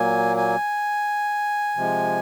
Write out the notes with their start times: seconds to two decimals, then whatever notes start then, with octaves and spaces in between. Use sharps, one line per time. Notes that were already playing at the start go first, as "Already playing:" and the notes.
Already playing: A#2 F#3 A#3 G#5
0.37 G#5
1.76 C3 F3 G#3